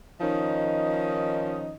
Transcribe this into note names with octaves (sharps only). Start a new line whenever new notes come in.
D#3 F3 C#4 D#4 D#5